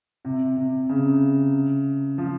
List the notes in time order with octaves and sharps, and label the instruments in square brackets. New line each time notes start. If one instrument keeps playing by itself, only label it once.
[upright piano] C3
C3
C#3
F3